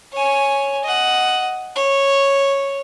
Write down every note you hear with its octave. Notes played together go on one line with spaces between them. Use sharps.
C#5 G#5
D#5 F#5
C#5